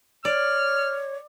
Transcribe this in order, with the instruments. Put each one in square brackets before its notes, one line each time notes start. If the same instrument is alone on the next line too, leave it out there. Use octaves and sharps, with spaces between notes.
[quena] C#5 [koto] D5 [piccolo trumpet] F6